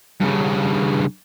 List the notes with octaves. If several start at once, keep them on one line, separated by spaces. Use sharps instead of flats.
G2 C#3